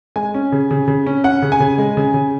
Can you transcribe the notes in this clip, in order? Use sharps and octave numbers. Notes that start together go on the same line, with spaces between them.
G#3 G#5
C#4
C#3
C#3
C#3
C#4
C#4 F#5
C#3
G#5
C#3
G#3
C#3
C#3